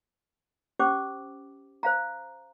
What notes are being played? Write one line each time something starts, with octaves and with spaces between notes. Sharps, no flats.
C#4 G4 C5 D6
C5 F5 A#5